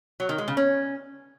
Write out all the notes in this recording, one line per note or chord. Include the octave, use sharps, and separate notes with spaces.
F#3
D#3
G#3
C#3
C#4